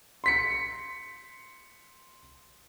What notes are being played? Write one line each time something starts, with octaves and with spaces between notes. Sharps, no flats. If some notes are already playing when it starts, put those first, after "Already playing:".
C6 B6 C#7